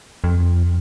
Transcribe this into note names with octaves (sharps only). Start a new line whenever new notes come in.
F2